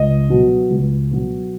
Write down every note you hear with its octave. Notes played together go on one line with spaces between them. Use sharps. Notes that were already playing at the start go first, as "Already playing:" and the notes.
Already playing: C#2 D#5
B2 F#3
C#2
B2 F#3